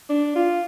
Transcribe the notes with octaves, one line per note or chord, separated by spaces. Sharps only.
D4
F4